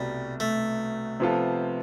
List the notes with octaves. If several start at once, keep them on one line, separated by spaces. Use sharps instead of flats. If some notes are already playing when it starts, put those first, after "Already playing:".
Already playing: C2 B2 G3 A3
A3
C3 F3 B3 F4 A4